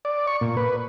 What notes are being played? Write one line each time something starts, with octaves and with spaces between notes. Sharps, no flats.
D5
C#6
A#2
B4